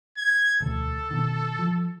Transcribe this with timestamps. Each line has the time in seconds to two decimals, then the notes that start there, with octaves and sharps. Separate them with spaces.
0.17 G#6
0.60 E1 D2 A4
1.11 B2 D#3
1.59 F3